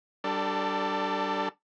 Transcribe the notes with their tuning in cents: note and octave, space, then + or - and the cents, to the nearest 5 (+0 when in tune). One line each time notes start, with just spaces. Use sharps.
G3 -15 D4 +0 A4 +25